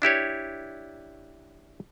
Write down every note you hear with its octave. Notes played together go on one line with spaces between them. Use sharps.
D4 E4 G4 C#5